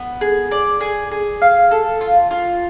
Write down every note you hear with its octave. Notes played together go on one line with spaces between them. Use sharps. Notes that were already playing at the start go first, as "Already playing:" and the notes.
Already playing: B3
G#4
D5
G#4
G#4
F5
A4
F4
F4